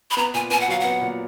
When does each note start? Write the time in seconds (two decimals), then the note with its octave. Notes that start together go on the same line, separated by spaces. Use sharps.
0.11 B5
0.17 B3 A#5
0.34 A#2 G#5
0.51 B3 G#5
0.60 F#5
0.68 F#3 F5
0.80 B3 F#5
1.01 A#2